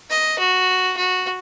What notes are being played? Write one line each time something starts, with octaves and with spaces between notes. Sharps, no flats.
D#5
F#4
F#4